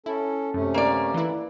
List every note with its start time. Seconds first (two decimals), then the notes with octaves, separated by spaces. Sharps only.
0.06 C#4 E4 A4
0.54 F#2 C3 A3 C#4
0.74 A#3 D5
1.14 E3 E4